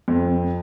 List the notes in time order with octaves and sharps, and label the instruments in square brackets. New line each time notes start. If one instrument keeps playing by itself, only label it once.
[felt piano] F2